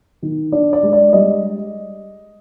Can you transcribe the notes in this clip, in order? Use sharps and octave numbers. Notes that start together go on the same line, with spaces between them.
D#3
D4 D5
D5
G#3
D5
G3 D#5